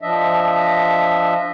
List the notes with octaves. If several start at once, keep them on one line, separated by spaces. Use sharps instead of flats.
F3 D4 D#5 E5